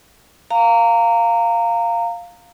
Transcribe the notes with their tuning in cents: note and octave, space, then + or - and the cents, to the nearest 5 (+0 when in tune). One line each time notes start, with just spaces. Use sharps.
F5 +0 A#5 -20